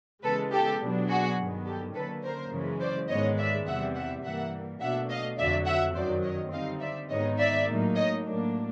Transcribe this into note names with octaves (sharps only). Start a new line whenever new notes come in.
C#3 E3 G#3 B3 A4 B4
G4 A4
B2 F#3 B3 D4
F#4 G#4
G2 D#3 F#3 B3
G4 A4
D3 F#3 A#3 C#4 A4 B4
A#4 C5
F#2 C#3 E3 G#3 C#4
C5 D5
G#2 D#3 G#3 B3 C#5 D#5
D5 E5
E2 C3 E3 G3 E5 F#5
E5 F#5
G2 E3 G3 A#3 E5 F#5
B2 F#3 A3 D4 E5 F#5
D#5 F5
F2 D3 F#3 D5 E5
E5 F#5
F#2 D#3 F#3 C5 D5
C#5 D#5
D3 G3 C4 D#4 D#5 F5
D5 E5
G#2 D#3 G#3 B3 D#4 C#5 D#5
D5 E5
A2 F#3 A#3 D#4
C#5 D#5
A2 F#3 A#3 D4